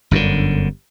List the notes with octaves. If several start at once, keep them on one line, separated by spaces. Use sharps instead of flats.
G1 F#2 A#2 D3